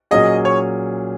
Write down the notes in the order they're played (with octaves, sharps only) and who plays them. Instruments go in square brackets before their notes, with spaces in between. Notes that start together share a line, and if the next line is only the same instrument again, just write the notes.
[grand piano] A#2 F#3 C#4 G#4 [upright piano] D#5
[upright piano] C#5